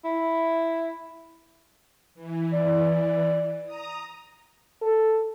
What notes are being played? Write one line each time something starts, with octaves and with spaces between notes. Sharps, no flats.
E4
E3
D5
A#5 D#6
A4